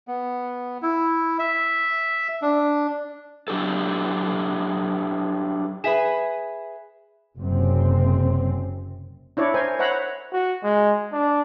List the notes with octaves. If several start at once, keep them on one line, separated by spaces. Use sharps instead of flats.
B3
E4
E5
D4
F#3 D4 G4 A4
G#4 B4 E5 B6 E7
F#1 F#2 C3 C4
D4 E4 C#5 D5
A#4 C5 G#5
C5 C#5 E5 F#5 A#5 B5
F#4
G#3
D4